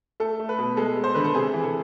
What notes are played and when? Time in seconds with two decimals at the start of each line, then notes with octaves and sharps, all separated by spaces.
0.20 A3 A4
0.40 A3
0.49 B4
0.58 B2
0.77 G#3 A4
0.97 G#3
1.04 C5
1.14 D3 B4
1.24 A4
1.35 C3 G#4
1.54 E3
1.63 A4